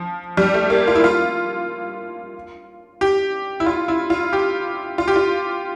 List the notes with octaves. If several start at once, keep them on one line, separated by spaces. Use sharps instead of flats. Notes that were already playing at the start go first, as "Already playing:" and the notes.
Already playing: F3
G3
A3
A#3
F4
E4
F4
G4
E4
F4
E4
F4
G4
F4
G4
F4